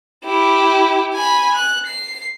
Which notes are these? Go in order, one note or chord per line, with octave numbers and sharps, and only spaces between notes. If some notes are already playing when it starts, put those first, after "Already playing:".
E4 G4
G#5 B5
F#6
C7